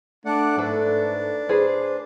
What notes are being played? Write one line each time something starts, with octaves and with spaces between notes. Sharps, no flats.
A3 D4 D5 F#5
G#2 D4 A4 B4
G#4 B4 C5